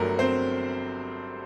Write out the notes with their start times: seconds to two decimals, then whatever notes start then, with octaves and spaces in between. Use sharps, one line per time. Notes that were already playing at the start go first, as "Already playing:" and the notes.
Already playing: G1 G2 F#3 A3 A#4
0.19 C4 C5